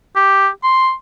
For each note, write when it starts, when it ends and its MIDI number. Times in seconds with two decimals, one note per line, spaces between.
0.16 0.48 67
0.63 0.93 84